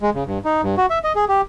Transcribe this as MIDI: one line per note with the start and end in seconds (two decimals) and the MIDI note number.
0.02 0.10 56
0.15 0.24 49
0.27 0.39 43
0.45 0.61 63
0.63 0.75 43
0.77 0.86 66
0.90 0.99 76
1.04 1.12 75
1.15 1.25 68
1.28 1.41 67